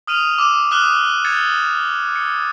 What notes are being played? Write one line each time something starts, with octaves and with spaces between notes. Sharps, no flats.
D#6 F6 D#7 F7
D6 E6 E7
D6 D#6 F6 F#6 E7
G#6 A6 C#7
C#7